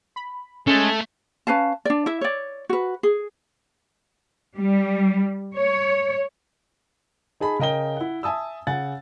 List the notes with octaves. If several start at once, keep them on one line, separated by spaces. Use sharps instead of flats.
B5
G#3 A3 C#4
C#4 B4 F5 A5
D4 D5
E4 E5
C#5 D5
F#4 B4
G#4
G3
C#5
D#4 G#4 A5 B5
C#3 A#4 D#5 G5 G7
E4 F#5
E5 G#5 A5 D#6 E6
C#3 F#5 G#5 A6